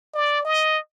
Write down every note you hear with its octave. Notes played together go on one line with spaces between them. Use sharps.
D5
D#5